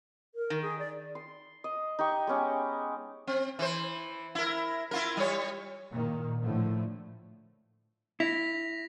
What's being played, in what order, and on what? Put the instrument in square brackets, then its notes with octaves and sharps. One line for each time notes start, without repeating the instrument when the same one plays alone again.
[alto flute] A#4
[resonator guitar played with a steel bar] D#3
[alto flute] G#4
D5
[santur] C6
D#5
D#4 G4 G5 C#6
G#3 B3 C#4 G4
[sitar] C4
E3 C5
E4 A#4
E4 F4 A#4
G3 C#5
[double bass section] A#2 D#3 A#3
A2 D3 F3 A3
[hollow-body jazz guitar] E4 [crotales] A#6 B6 F7